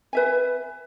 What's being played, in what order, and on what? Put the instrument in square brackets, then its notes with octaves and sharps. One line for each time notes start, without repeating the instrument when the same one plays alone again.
[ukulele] B4 E5 G#5